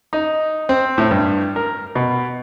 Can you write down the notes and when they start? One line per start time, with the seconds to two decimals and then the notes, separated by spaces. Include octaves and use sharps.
0.13 D#4
0.69 C4
0.98 A2
1.11 G2
1.56 A#4
1.95 B2